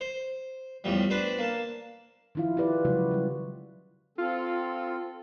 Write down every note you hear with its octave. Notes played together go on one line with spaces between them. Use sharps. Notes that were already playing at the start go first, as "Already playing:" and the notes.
C5
E2 A2 F3 G3
D4 B4 C5 D5
A#3 A5
D#3 F3 E4 F4 F5
E4 F4 G4 B4 D5
C#3 F3 F#3 G#3 F#4
F#3 G3
C4 F4 A4